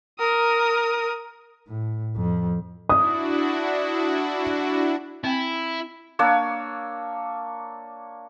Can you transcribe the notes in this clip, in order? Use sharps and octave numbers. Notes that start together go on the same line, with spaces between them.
A#4 D#6
A2
F2
D4 E4 F#4 D#6
C4 E4 G5 G#5
A#3 D4 C#5 E6